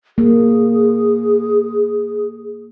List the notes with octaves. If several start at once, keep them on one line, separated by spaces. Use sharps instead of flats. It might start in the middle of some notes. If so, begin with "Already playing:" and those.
A#3 G#4